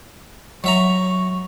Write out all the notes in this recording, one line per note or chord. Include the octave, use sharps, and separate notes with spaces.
F#3 E5 A#5 C#6